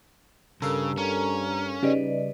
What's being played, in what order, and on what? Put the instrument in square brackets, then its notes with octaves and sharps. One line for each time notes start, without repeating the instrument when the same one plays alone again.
[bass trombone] G2 [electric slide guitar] C#3 [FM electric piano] A4 A#4 F5 [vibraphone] E6
[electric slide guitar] C#4 [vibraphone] A#5
[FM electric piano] C#3 G3 D#4 [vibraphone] B4 D5 D#5